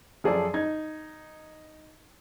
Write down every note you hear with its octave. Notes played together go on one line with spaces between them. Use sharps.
F#2 F3 G#4 A4 D5
D#4 G#6